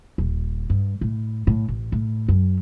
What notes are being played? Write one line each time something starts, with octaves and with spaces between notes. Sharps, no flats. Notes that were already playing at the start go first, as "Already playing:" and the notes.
D#1
G2
A2
A2
A1
A2
F#2